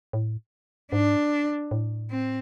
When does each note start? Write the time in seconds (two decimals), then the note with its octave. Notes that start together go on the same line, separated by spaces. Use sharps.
0.13 A2
0.92 G#2 D4
1.71 A2
2.10 C4